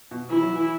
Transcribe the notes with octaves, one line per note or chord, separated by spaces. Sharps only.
B2
E3 E4
F#3
E3